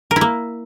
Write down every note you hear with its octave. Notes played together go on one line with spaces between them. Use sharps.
A#4
E4
A#3